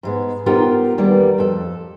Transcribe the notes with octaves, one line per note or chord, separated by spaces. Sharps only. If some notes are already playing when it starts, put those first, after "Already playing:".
G#2 G#3 B3
B3 D#4 F4 G4 A#4 C5
E2 D#3 G3 A#3 B3 D5
F2 A4